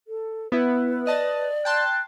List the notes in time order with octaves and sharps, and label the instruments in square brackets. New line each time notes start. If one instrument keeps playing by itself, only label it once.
[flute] A4
[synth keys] B3 E4 [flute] B4
[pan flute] D5 [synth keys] D#5 A5
[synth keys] G5 A5 C6 [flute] F#6